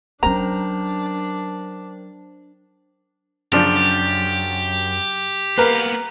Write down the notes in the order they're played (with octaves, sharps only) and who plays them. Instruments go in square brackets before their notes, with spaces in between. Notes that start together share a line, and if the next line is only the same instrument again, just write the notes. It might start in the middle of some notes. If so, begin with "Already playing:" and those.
[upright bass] F#3 C#4 [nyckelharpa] D4 [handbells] A#4 C5 G5 [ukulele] A#5
[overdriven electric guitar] F#2 [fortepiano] C#3 F3 D4 [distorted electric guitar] G4
[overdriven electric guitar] A#3 B3 [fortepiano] A#4 B4